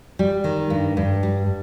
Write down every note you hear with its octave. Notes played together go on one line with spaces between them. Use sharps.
G3
D#3
G2
G2
G3